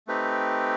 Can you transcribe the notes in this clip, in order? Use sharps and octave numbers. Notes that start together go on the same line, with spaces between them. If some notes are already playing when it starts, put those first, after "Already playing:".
A3 C4 D#4 G4 B4